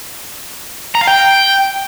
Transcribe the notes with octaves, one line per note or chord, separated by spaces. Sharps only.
A#5
F5
G5